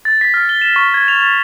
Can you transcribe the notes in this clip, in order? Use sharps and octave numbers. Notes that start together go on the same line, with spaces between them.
A6
B6
F6
G7
E7
C#6
G#6
F7
A6